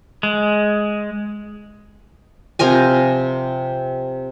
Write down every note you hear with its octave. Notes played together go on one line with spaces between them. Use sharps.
G#3
C3 F3 A#4 G#5